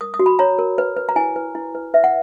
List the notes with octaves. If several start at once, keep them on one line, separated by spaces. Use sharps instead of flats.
A#4 D#6
D#6
F#4
B5
C#5 A#5
A#4
B4
B4
A#5
E4 G#5
B4
E4
B4
B4 E5
F#5